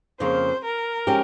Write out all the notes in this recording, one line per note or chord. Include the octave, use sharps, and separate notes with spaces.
F2 C#3 F3 A#3 F4 C5
A#4
F3 G#3 C#4 G4